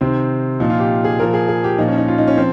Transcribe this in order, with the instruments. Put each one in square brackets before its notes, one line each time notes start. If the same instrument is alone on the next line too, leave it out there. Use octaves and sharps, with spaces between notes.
[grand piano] C3 D#3 C4
A#2 F3 D#4
F4
G4
G#4
A#2 F3 A#4
G#4
G#4
G4
A#2 F3 D#4
C#4
D#4
F4
D#4
C#4
F3 C4